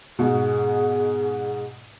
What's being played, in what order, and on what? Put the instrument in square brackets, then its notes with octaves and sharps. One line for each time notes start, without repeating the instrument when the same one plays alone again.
[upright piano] G#2 B2 [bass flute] G#4